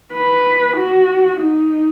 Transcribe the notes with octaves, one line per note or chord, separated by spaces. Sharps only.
B4
F#4
D#4